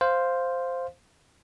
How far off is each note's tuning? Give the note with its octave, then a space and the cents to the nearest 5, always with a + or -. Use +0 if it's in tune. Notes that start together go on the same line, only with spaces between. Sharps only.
C5 +0 F5 +0